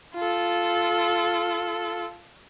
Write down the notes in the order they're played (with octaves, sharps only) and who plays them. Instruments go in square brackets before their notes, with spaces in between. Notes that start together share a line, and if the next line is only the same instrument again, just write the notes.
[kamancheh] F4 A4